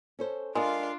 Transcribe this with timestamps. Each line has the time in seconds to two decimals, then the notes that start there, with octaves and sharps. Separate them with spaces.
0.19 C#4 A4 C5
0.55 G#3 D4 F4 A#4 D5 F5